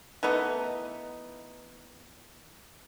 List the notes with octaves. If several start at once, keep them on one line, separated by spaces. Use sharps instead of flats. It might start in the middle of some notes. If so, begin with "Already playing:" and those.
E3 A3 B3 D#4